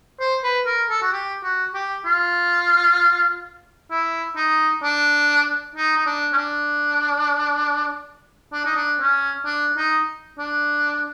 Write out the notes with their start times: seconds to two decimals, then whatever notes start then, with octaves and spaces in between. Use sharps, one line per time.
0.20 C5
0.43 B4
0.66 A#4
0.89 A4
1.02 F#4
1.13 G4
1.43 F#4
1.74 G4
2.05 F4
3.91 E4
4.36 D#4
4.83 D4
5.75 D#4
5.96 D#4
6.06 D4
6.32 C#4
6.37 D4
8.53 D4
8.65 D#4
8.76 D4
9.00 C#4
9.45 D4
9.77 D#4
10.39 D4